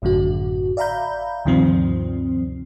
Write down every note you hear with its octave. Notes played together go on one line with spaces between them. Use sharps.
G#1 F#2 A2 D3 F#4
D5 E5 F5 A#5 B5 G6
D2 G2 C3 D#3 F3 C4